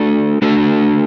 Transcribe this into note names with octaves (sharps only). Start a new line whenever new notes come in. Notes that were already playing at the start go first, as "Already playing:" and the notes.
Already playing: A3 D4 F#4 A4
A3 D4 F#4 A4